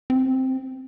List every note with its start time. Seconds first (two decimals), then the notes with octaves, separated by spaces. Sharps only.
0.10 C4